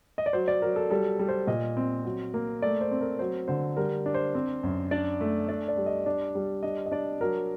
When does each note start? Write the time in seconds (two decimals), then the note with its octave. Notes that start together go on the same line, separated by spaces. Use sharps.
0.18 D#5
0.26 D5
0.33 F#3 C5
0.48 D5
0.62 F#3 A#4
0.76 A4
0.91 G3 A4
1.19 G3
1.29 C5
1.47 A#2 D#5
1.77 C4
2.05 F#3
2.34 A#3
2.62 A3 D5
2.81 C5
2.91 C4
3.01 A#4
3.19 F#3 C5
3.48 D3 C5
3.77 G3 A#4
4.06 D4
4.14 C5
4.35 C4
4.63 F#2
4.91 D4 D5
5.21 A3
5.48 D4 D5
5.68 D5
5.77 G3
5.86 D#5
6.06 D4 D5
6.35 G3
6.63 D4 D#5
6.86 D#5
6.92 D4 D5
7.21 F#3 A#4